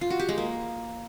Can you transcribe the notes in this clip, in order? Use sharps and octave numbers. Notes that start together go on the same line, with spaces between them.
F4
F#4
G4
G#3
A#3